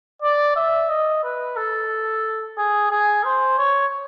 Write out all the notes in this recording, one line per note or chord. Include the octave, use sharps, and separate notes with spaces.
D5
E5
D#5
B4
A4
G#4
G#4
C5
C#5